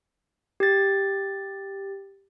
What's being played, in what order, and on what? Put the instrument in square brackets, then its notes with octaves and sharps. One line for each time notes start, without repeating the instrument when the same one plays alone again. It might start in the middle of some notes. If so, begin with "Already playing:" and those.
[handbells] G4 A6